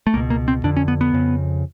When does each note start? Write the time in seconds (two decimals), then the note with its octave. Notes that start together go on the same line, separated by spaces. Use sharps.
0.07 A3
0.14 C#2 B2 A#3
0.30 A#3
0.48 C4
0.64 F2 D3 D4
0.77 C#4
0.88 B3
1.01 B3
1.13 F2 C#3